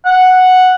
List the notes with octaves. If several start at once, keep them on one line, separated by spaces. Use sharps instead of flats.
F#5